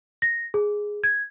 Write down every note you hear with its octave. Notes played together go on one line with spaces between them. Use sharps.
A#6
G#4
G#6